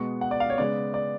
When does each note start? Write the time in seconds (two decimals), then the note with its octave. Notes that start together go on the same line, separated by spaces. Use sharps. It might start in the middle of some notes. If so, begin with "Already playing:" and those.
Already playing: B2 G#3 B3 C#6
0.21 F#5
0.31 D5
0.40 F5
0.50 C#5
0.58 C#3 G#3 B3 D5
0.94 D5